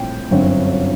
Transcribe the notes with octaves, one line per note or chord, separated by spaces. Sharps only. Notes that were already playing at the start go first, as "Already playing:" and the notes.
Already playing: A#1 A2 G3 C4 G5
G1 F#2 D3 F#3 C4